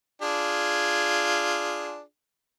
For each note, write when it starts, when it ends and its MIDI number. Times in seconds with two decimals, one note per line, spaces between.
0.22 2.01 62
0.22 2.01 65
0.22 2.01 68